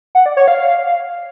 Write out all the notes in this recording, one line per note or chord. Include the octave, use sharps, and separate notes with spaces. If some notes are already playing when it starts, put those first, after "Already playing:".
F#5
D5
C#5
F5